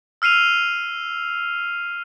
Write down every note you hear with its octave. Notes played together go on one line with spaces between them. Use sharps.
E6 F6 C7 D#7 F7